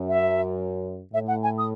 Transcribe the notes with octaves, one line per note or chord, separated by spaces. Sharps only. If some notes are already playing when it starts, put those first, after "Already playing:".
Already playing: F#2
E5
A2 E5
F#5
G#5
D#6